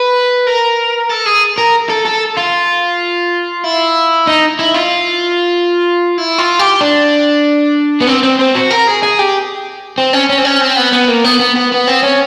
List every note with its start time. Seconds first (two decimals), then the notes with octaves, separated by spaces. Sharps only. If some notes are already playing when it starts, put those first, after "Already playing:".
Already playing: B4
0.47 A#4
1.10 A4
1.26 G#4
1.58 A#4
1.89 A4
2.05 A4
2.37 F4
3.64 E4
4.27 D#4
4.59 E4
4.74 F4
6.18 E4
6.38 F4
6.59 G4
6.81 D4
8.01 B3
8.07 C4
8.23 C4
8.39 C4
8.55 F#4
8.71 A#4
8.87 G#4
9.03 G#4
9.19 G4
9.98 C4
10.13 C#4
10.29 C#4
10.38 C4
10.45 C#4
10.61 C4
10.76 B3
10.93 B3
11.09 A#3
11.24 B3
11.40 B3
11.56 B3
11.72 B3
11.88 C4
12.03 C#4